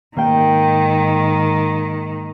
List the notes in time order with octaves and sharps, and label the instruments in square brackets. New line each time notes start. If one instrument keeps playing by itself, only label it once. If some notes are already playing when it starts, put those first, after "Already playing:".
[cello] G#2 D#3 [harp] A#3 G5